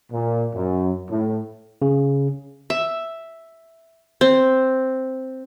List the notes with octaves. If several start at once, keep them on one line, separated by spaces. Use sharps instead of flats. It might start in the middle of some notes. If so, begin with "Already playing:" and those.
A#2
F#2
A2
C#3
E5
C4